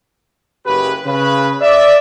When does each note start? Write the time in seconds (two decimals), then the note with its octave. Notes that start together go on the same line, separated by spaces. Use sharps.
0.66 F#1 C#3 G4 B4
1.05 C#3 B4
1.61 D5 E5